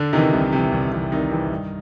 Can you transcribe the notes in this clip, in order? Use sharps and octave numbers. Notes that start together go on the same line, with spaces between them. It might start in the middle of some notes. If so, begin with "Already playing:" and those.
Already playing: D3 D4
C3 D#3 E3 D#4
C2
C3 E3
C2
C3 E3
C2 D#3 D#4
C3 E3
G2